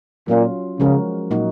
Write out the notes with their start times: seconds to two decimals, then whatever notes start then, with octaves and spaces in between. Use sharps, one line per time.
0.28 A#2 F#3 C#4 F4
0.80 C#3 F3 G#3 C#4 F#4 A#4
1.31 A#2 F#3 A#3 D#4 F#4